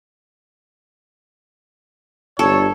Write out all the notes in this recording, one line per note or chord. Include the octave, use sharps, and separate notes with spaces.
G1 A4 C#5